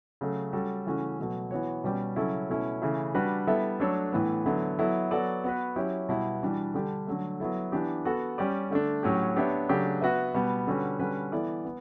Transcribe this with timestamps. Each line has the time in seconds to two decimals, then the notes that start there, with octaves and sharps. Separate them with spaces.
0.21 C#3 F#3 A3
0.53 G3 C#4 F#4 A4
0.86 C#3 E3 A3 C#4 F#4
1.19 B2 F#3 A3
1.51 E3 B3 F#4 C#5
1.84 B2 G3 C#4 G4 D5
2.16 C#3 F#3 C#4 E4 A4
2.50 B2 A3 C#4 E4
2.82 C#3 E3 A3 E4
3.15 G3 D4 F#4 B4
3.47 G3 B3 E4 A4 E5
3.80 F#3 A3 D4 A4 C#5
4.12 A2 E3 B3
4.46 D3 F#3 B3 E4
4.79 F#3 B3 E4 A4
5.11 F#3 B3 F#4 A4 D5
5.44 B3 F#4 B4
5.76 F#3 C#4 E4 G4 C#5
6.09 B2 G3 B3 E4
6.42 E3 G3 D4 F#4
6.74 D3 G3 D4 G4
7.07 D3 F#3 A3
7.40 F#3 B3 E4 A4
7.72 E3 B3 D4 G4
8.05 B3 F#4 A4
8.38 G3 C#4 G4 D5
8.70 D3 A3 D4
9.03 A2 F#3 C#4 G4
9.36 B3 D4 G4 C#5 E5
9.69 C#3 F#3 A3 D4 G4
10.01 B3 F#4 B4 E5
10.34 B2 G3 B3
10.67 D3 G3 C#4 F#4 B4
10.99 D3 G3 C#4 F#4 B4
11.32 E3 B3 E4 A4 D5
11.65 B3